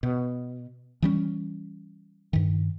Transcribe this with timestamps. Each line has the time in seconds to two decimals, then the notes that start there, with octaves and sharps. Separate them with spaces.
0.03 B2
1.02 E3 G3 C#4
2.33 G2 D#3